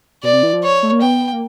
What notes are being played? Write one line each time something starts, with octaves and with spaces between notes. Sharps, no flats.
B2 D5
C3
E3
F3
C#5
A3
A#3
B3 G5
A#3